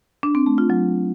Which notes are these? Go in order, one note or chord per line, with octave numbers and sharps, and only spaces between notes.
D4
C4
A3
F4
F#3